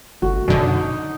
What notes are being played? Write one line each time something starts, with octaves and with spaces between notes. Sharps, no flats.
G1 A3 F#4
F#2 B2 D3 D#4